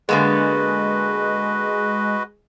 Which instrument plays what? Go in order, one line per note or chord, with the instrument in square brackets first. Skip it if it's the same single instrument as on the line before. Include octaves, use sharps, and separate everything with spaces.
[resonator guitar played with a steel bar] D3 A#3 B3 [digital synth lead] G#3 [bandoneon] F#4 B4 D#5